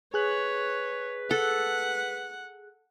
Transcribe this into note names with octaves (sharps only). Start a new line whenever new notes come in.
G#4 B4 C#5 F#6
A4 F#5